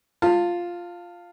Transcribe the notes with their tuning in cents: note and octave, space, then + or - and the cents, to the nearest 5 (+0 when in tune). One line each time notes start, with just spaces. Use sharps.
F4 +0 F5 +0 A5 +25